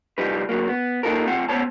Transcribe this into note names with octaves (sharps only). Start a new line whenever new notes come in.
C2 F3 G3 D#4 B4
D3 F#3 A#3
B3
A#3 D#4 F4 A4 A#4
B1 C4 F4 F#5
B3 C5 C#5 A5